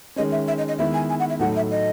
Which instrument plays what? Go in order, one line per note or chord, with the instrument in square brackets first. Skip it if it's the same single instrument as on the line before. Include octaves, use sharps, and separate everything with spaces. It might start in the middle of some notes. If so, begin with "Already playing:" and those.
[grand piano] D#3 G#3 C#4 [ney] D#5
[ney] E5
E5
D#5
D#5
[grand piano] D#3 G#3 B3 E4 [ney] E5
[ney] G#5
G#5
F#5
E5
[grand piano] A2 F#3 A3 D#4 [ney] F#5
[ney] E5
D#5